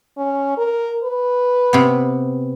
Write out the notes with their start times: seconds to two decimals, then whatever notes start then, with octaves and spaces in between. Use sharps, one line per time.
0.17 C#4
0.58 A#4
1.04 B4
1.73 C3 B3